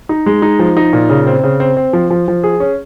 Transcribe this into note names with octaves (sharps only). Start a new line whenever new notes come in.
D#4
G#3
D#4
F3
D#4
A#2
C#3
C4
C#3
C4
C4
F3
F3
F3
G#4
C#4